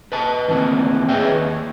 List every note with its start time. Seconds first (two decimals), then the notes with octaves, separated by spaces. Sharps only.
0.12 B4 D#5 A5
0.48 A2 D#3 E3 A#3 C4
1.08 G#4 B4 C#5 D#5 E5 G5
1.32 D#2